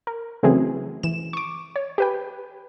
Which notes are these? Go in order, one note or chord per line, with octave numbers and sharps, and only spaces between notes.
A#4
C#3 E3 F#3 A3 C4 G#4
E3 E7
C#6 D6
C#5
G4 B4 G5